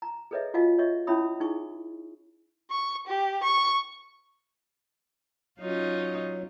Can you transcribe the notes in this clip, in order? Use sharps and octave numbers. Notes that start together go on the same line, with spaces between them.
A#5
G#4 A4 B4 C#5 D#5 E5
F4 F#4 D#5 F5 G#5
C#5 D#5 E5 C#6
C#4 E4 C#5 E5 B5 D#6
D#4 E4 G#4 G#5 C#6
C#6
G4
C#6
F#3 C#4 D#4 F4